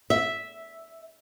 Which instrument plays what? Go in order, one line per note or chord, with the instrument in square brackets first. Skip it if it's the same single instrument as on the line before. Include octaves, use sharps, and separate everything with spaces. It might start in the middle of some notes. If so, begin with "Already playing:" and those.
[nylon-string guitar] E5